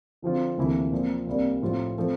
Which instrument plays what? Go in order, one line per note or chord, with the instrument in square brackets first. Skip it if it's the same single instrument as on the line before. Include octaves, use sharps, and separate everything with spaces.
[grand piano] D3 F3 C4 F4
D2 C3 E3 A#3 E4
A#2 F3 C4
C2 C3 G3 A#3 D4
A2 F3 C4 F4
F3 A3 C4